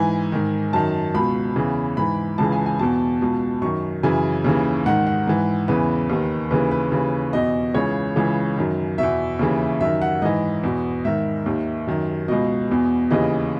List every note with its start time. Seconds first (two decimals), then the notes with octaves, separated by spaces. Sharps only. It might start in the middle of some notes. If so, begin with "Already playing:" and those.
Already playing: G#2 E3 G#5
0.32 G#2 D#3
0.73 F#2 D#3 A5
1.15 C#2 B2 B5
1.56 E2 C#3 E3
1.97 G#2 E3 B5
2.38 C#2 C#3 E3 A5
2.52 G#5
2.66 G#5
2.79 E2 B2 A5
3.21 C#2 B2
3.62 F#2 D#3 C#6
4.03 F#2 C#3 E3 G#5
4.44 D#2 C#3 E3
4.86 G#2 D#3 F#5
5.07 F#5
5.27 G#2 E3
5.68 E2 C#3 E3 B4
6.10 D#2 D#3
6.51 D#2 C#3 E3 B4
6.71 B4
6.92 D#2 C#3 E3
7.33 E2 B2 D#5
7.74 C#2 C#3 E3 C#5
8.16 C#2 C#3 E3
8.57 F#2 D#3
8.98 E2 B2 E5
9.39 D#2 C#3 E3
9.81 F#2 D#3 E5
10.02 F#5
10.22 G#2 E3 D#5
10.63 E2 B2
11.05 G#2 D#3 E5
11.46 D#2 D#3
11.87 F#2 D#3
12.28 C#2 B2 D#5
12.69 E2 B2
13.11 D#2 C#3 E3 D#5